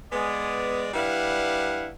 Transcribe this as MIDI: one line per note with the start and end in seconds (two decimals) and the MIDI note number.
0.11 0.89 56
0.11 0.89 59
0.11 0.89 74
0.94 1.89 55
0.94 1.89 62
0.94 1.89 64
0.94 1.89 71
0.94 1.89 77
0.94 1.89 78